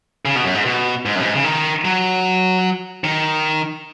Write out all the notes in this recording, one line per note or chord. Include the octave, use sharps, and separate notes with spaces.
C#3
B2
F#2
G#2
B2
G#2
F#2
B2
G#2
C#3
D#3
F#3
D#3